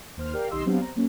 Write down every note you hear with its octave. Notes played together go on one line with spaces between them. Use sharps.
D#2 C5 F6
G4 A#4 D5 F5 G5
B1 D#3 G4 D#5 C6 E6
F#3 B3 C4 D4 G4 F5
C5 A#5
F#3 A#3 C#4